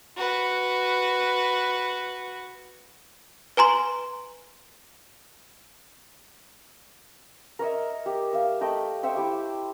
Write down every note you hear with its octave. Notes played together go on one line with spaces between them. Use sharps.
F#4 B4
B4 G#5 A#5 C6
A#4 C#5 D#5 E5
G4
E5 F5
A3 D#5 G5 B5
C5 E5 G5 C#6
E4 G4 D6